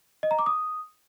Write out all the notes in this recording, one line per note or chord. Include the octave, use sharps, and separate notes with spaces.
D#5
A#5
D6
D#6